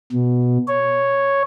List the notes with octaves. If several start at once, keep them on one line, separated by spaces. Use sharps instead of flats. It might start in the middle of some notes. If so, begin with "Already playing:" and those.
B2
C#5